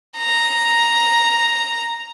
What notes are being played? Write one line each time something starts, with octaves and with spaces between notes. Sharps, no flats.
A#5